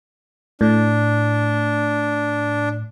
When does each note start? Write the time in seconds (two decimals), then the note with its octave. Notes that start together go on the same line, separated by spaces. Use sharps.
0.61 A2 D4